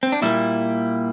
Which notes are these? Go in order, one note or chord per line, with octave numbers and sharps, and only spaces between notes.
C4
D4
A#2 G3 A#3 E4